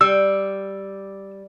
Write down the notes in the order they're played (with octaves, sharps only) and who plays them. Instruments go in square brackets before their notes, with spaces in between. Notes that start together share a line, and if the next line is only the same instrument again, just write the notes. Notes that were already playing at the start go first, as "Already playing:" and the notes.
[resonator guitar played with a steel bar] G3 [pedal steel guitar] E6